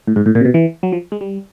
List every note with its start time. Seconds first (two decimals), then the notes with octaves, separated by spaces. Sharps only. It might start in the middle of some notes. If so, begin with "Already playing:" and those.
0.07 A2
0.16 G#2
0.26 A2
0.35 A#2
0.41 C3
0.45 B2
0.54 E3
0.83 F#3
0.92 F3
1.12 G#3
1.21 G3